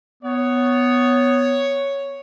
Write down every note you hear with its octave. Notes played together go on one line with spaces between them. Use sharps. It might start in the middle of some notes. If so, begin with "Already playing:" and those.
B3 C#5